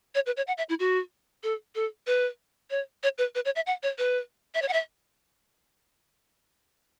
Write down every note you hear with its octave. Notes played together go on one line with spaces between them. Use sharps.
C#5
B4
C#5
F#5
E5
E4
F#4
A4
A4
B4
C#5
C#5
B4
B4
C#5
E5
F#5
C#5
B4
E5
C#5
F#5
E5